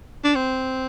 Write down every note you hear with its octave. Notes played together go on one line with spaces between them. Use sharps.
D4
C4